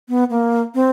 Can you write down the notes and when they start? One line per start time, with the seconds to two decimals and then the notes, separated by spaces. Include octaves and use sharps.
0.09 B3
0.30 A#3
0.74 C4